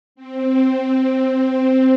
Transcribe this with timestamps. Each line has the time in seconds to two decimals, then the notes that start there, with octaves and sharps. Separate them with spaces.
0.16 C4